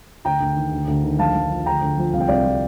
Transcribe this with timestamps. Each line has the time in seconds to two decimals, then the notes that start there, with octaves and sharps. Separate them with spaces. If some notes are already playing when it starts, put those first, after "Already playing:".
0.25 D2 G5 A#5
0.40 D2
0.56 D#3
0.72 D2
0.88 D2
1.04 D#3
1.19 A#1 F5 A5
1.35 A#1
1.50 F3
1.66 D2 G5 A#5
1.82 D2
1.98 F3
2.13 C2 F5
2.20 G5
2.28 C2 D5 F5
2.45 F3